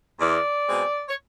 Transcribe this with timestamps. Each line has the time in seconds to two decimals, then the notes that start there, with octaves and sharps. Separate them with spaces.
0.20 E2 D5
0.67 B2 G#3 C4
1.09 C#5